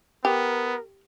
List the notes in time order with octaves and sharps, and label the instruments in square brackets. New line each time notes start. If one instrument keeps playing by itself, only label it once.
[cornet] B3 [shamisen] G4 [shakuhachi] A#4